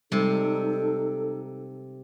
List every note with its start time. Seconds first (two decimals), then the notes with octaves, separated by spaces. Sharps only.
0.12 C3 G3 G#3 D#4 A4